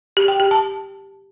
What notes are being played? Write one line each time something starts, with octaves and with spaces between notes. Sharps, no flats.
G4
G5
G4
A5